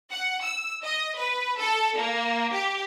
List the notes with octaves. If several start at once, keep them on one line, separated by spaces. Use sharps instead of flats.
F#5
E6
D#5
B4
A4
A#3
G4